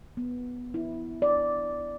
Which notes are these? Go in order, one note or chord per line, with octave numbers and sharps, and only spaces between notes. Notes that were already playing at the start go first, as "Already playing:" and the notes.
B3
E4
D5